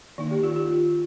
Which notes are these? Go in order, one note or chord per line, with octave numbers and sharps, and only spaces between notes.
D#3 A#3 D#4
G4
F4
F4